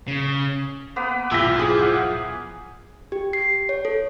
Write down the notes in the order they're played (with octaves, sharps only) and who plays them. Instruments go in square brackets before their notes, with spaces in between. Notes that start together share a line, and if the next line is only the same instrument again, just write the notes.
[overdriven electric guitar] C#3
[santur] A#3 B3 B4
[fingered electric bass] D#1 B1 G#2 [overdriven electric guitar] F3 [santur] E4 G4 [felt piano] E6 B6
[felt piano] G#4
[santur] F#5
[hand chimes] G4
C7
C#5
A4